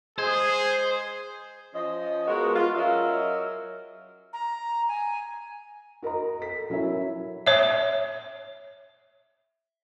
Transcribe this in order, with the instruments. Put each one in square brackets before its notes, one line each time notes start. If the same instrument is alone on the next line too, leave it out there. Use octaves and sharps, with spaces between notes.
[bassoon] G#3 [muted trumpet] G#4 [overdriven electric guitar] C5 [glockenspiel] G#6
[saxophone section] F3 C#4 D#5
G#3 B3 F#4 G#4 A#4
F4
F#3 C#4 A#4 D#5 E5
[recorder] A#5
G#5
[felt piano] F#4 A#4 D#5 A#5
A4 B6
F#3 C#4 E4 A#4 E5
[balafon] C#5 E5